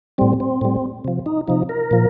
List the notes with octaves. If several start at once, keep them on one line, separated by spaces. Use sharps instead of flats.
A2 G3 C4
C4
A2 G3
C3 F3
D#4
C3 F3 D#4
A#4
A#2 F3